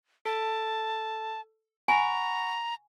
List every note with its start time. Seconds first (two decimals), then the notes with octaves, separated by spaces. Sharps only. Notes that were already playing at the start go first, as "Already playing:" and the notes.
0.25 A4 A5
1.88 F#5 G#5 A#5 B5 C#6